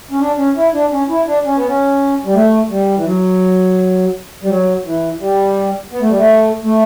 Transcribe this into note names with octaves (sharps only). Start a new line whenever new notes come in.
C#4
D4
C#4
E4
D4
C#4
E4
D4
C#4
B3
C#4
G3
A3
G3
E3
F#3
G3
F#3
E3
G3
B3
A3
G3
A3
A3